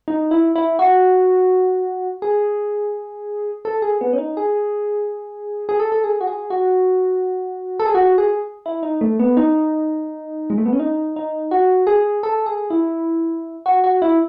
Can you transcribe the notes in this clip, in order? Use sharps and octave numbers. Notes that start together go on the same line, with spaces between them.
D#4
E4
E4
F#4
G#4
A4
G#4
B3
C#4
D#4
G#4
G#4
A4
A4
G#4
F#4
G#4
F#4
A4
G#4
F#4
G#4
E4
D#4
A3
B3
D#4
G#3
A3
B3
C#4
D#4
D#4
F#4
G#4
A4
G#4
E4
F#4
F#4
E4